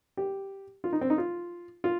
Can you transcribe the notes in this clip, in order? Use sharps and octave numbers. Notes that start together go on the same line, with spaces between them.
G4
F4
D#4
C4
D#4
F4
F4